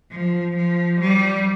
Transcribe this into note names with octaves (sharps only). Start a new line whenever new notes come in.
F3
F3
G3